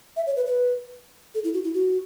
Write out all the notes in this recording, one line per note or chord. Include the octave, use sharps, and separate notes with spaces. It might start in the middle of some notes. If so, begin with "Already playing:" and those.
E5
C#5
B4
B4
A4
E4
F#4
E4
F#4